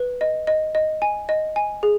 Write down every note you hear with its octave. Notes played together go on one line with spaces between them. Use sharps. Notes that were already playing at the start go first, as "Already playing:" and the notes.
Already playing: B4
D#5
D#5
D#5
G#5
D#5
G#5
G#4